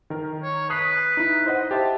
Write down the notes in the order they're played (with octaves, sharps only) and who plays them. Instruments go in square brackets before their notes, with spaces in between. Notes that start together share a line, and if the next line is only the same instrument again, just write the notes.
[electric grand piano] D#3 A#4
[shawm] C#5
[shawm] B4 [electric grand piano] D#6 F#6 C7
[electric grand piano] D#4 E4
C5 D#5 F#5
[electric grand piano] G4 C5 E5 [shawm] A5